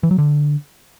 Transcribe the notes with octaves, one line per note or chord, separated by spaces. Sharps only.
E3
F#3
D3